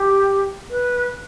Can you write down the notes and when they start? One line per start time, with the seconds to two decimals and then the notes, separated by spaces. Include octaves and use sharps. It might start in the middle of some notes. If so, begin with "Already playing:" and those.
Already playing: G4
0.70 B4